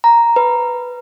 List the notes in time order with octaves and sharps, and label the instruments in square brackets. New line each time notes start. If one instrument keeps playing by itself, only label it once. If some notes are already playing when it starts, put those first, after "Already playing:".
[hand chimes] A#5
B4